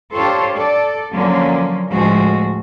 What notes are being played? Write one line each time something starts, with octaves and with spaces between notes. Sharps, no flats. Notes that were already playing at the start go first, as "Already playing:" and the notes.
D4 F4 G4 A4 C5 C#5
A4 D5
D3 F3 F#3 A#3 C#4
D2 A2 F3 G#3 A3 F#4